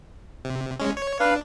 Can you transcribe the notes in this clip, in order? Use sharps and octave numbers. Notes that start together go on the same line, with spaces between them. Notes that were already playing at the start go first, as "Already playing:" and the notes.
C3
G#3 C#4
C#5
D4 B4 F5